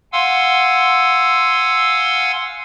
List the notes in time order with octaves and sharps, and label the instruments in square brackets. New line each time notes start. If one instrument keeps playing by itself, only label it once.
[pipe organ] F5 F#5 G#5 C6 E6